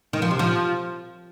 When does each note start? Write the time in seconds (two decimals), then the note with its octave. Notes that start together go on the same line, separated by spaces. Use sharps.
0.13 D#3
0.22 F3
0.31 C3
0.39 F3